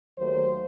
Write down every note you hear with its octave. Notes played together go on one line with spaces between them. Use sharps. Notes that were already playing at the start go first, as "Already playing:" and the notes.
D#2 D#3 F#3 A3 C5